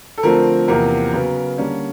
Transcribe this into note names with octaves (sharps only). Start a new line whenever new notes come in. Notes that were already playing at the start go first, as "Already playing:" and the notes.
A4
D3 F3 A3 C4 A#4
E2 C3 F3 A#3 A#4
C#3 F#3 B3
D3 G3 A#3 C#4